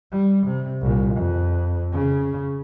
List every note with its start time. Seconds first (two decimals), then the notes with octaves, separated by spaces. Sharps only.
0.12 G3
0.47 C3
0.81 C2 A#2
1.15 F2
1.92 C#3